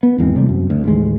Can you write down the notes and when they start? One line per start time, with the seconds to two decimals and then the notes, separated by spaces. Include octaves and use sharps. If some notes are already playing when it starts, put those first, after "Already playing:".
0.03 B3
0.18 G#1 E2 G#3 C4
0.36 C3 G3 A3
0.49 F#2
0.70 D2
0.84 A1 D#2 G#3